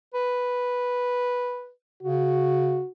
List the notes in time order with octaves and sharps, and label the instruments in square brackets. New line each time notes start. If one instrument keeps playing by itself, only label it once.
[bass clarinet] B4
[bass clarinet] C#3 [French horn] F#4